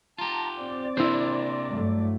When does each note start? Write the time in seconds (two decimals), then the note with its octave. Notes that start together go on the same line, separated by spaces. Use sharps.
0.18 F4 G4 A5 A#5
0.58 C4 D5 D6
0.97 C3 A#3 D4 E4 C5
1.70 G2 F#3 A3